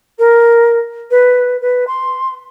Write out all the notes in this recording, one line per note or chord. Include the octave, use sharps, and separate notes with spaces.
A#4
B4
B4
C6